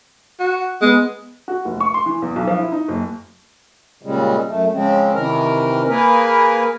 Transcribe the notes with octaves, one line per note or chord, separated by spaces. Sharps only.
F#4
G#3 B3
F#4
F1
C#6
C6
E3
E2
B1
F3
E4
D#4
F#1
A#2 C#3 G3 G#3
F#2 A3
C#3 F3 G#3 C4
C3 D#3 E3 A#4
A#3 G#4 A#4 B4